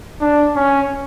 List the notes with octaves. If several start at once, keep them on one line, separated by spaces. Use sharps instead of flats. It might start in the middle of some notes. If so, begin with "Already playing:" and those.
D4
C#4